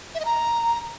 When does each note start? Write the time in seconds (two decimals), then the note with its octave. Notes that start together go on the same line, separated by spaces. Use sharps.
0.15 E5
0.20 D#5
0.25 A#5